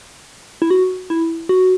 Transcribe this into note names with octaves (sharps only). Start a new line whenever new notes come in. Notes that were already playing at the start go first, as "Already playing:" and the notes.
E4
F#4
E4
F#4